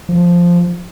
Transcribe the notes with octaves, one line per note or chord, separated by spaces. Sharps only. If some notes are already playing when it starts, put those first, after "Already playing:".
F3